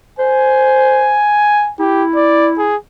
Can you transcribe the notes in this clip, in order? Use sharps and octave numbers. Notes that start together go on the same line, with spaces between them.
C5 G#5
E4 G4
D5
G#4